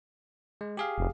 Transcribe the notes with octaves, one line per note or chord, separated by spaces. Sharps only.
G#3
G4 G#4 F5
F1